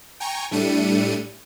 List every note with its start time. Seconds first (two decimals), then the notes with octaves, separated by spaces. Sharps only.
0.20 G5 G#5 A#5 C#6
0.51 A2 G3 A3 D4 C#7 D#7